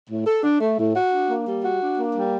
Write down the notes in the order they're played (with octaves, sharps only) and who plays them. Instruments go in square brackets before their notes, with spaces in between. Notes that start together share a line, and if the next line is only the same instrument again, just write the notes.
[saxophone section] A2
A4
D4
A3
A2
F#4
D4
A#3
G3
F#4
D4
A#3
G3